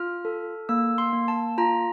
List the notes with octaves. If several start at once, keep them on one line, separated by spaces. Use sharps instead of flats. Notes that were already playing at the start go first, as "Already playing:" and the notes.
Already playing: F4 F6
A4
A#3 E6
C6
A#3
A5
F4 A#5